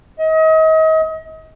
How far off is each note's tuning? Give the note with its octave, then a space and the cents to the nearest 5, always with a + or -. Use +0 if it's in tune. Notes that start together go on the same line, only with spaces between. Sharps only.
D#5 +35